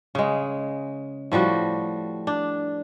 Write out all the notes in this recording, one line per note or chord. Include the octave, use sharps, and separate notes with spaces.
C#3 G#3
A2 F3 G3 F#4
D4